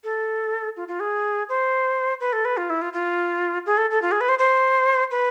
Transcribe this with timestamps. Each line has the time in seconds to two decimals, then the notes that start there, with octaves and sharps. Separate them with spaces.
0.04 A4
0.76 F4
0.88 F4
1.00 G#4
1.49 C5
2.20 B4
2.33 A4
2.45 B4
2.57 F4
2.70 E4
2.81 F4
2.93 F4
3.66 G#4
3.77 A4
3.90 A4
4.02 F4
4.11 G#4
4.21 B4
4.29 C5
4.39 C5
5.11 B4